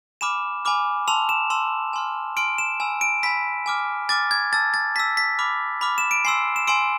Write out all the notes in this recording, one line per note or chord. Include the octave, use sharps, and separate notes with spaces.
G#5 B5 D6 F6 E7
G#5 B5 D6 F6
A5 C6 E6 F7
E7
A5 C6 E6
G#5 C6 F6
G#5 C6 F6 D7
E7
G#5 B5 E6
D7
G#5 B5 E6 B6
G#5 D6 F6
G#5 D6 F6 A6
G#6
A5 E6 A6
A6
A5 E6 B6
B6
B5 D6 F6
B5 D6 F6
E7
D7
G#5 C6 E6 C7
E7
G#5 C6 E6 D7